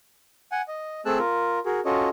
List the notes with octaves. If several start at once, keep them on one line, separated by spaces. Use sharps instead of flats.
F#5 G#5
D#5
A3 C4 G#4 A5 E6 F#6
F4 A#4
F#4 G#4 A#4
C#4 F4 F#4 A4 C#5 D#5